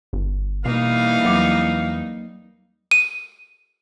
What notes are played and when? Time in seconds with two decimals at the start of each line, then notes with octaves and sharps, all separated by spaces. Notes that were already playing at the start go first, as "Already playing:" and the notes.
0.13 G1
0.65 B2 E3 G3 A#3 D#4 F5
1.24 E2 F#3 C4 D6
2.91 D#7